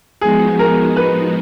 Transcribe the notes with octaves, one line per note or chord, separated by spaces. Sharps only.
F3 G#3 B3 D#4 F#4 G#4
A#4
B4